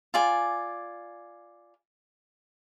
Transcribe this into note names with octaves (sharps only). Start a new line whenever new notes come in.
F4 D5 G#5